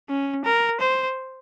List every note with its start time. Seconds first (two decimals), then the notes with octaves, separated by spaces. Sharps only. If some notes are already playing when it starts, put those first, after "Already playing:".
0.09 C#4
0.45 A#4
0.81 C5